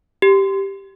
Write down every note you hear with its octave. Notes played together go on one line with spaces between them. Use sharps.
G4